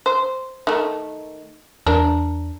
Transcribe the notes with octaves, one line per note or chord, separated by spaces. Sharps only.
C5
D#3 A3
E2 D4 A#4